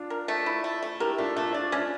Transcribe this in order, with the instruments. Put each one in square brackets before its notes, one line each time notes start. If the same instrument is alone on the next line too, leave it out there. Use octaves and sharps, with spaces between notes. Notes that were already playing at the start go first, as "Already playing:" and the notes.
Already playing: [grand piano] D4 F4
[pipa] A#4
A3
E4
A3
A3
[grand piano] E4 G4 [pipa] A#4
[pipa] A3 [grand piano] D4 F4
[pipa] A3 [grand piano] D4 F4
[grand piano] E4
[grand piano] D4 F4 [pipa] D5
[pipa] C#4 [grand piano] D4 F4